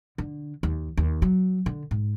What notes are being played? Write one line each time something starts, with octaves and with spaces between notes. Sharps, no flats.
D3
D#2
D#2
F#3
D3
G#2